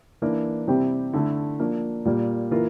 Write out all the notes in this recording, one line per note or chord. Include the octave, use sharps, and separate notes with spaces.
E3 A#3 D4
C3 G3 C4 E4 G4
D3 A3 E4
F3 A#3 D4
A#2 G3 A#3
E3 A#3 F4 A#4